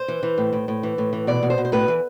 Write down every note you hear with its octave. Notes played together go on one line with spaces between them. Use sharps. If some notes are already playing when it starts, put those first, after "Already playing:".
Already playing: C5
E3
E3
A2
A2
A2
E3
A2
E3
B2 D5
B2
C5
B2
C5
A2 B4
E3